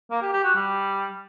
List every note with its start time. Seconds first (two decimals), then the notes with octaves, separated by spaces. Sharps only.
0.11 A#3
0.22 G4
0.33 G4
0.44 F#4
0.55 G3